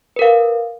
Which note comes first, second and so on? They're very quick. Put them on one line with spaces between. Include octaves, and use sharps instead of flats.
B4 A#4 F5